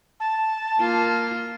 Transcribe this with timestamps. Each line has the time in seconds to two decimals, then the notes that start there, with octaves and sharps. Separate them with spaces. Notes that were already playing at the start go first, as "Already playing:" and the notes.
0.20 A5
0.79 A#3 F4